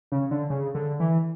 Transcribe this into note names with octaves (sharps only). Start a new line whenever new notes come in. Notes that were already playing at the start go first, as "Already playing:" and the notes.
C#3
D3
C#3
D3
E3